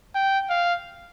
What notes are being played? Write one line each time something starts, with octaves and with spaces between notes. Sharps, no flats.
G5
F5